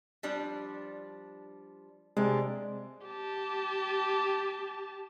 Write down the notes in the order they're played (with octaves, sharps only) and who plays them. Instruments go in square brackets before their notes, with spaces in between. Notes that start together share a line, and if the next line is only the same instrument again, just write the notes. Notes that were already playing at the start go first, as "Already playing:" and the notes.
[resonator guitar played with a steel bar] F3 G3 D4
[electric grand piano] C3 G#3 [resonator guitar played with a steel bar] D4
[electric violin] G4 A5